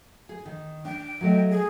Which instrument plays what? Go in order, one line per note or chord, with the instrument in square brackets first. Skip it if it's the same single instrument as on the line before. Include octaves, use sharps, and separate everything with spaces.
[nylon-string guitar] G#4
D#3
[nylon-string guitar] D4 [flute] G5
[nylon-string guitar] F#3 A3 D#5
[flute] G#4